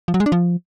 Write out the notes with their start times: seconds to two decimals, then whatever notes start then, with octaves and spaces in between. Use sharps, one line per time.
0.08 F3
0.14 F#3
0.20 G#3
0.26 D4
0.32 F3